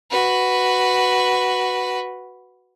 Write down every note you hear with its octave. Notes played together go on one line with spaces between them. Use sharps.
F#4 B4